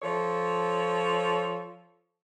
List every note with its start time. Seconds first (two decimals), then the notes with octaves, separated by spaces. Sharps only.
0.02 F3 A4 C#5